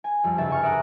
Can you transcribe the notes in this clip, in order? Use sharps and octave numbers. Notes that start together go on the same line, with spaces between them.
G#5
B1 F2 G3
C2 G2 C#3 B3 E5 A6
G#5 C#6 F6
A#4 D5 E5 A#5 D#6 F#6